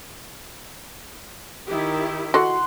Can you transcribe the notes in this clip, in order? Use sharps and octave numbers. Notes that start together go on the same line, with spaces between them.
D#3 E4 G4
F#4 A4 D#5 F#5 C6